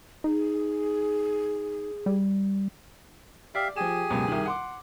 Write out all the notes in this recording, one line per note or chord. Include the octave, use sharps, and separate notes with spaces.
D#4 G#4
G3
G4 D5 E5 F5
F3 G4 G#4 G#5 E7
C#2 F#2 B2
C2 D#3
F#5 C6 D6